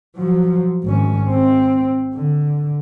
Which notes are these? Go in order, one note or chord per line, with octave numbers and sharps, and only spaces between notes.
F3 F#3
G#1 C#4
C4
D3